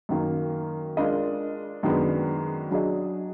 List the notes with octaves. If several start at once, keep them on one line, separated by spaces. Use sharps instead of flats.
F#2 D#3 A#3
G#3 D4 F4 A#4 D#5
F#2 D#3 G#3 B3 D4
F#3 D4 G#4 D#5